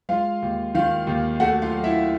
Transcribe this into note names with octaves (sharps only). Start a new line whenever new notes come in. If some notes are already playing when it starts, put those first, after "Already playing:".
G#3 F4 F5
D#2
D#3 F4 F5
D#2
A3 F#4 F#5
F4 F5
F#3
E4 E5